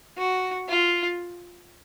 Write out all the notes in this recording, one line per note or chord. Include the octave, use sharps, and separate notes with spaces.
F#4
F4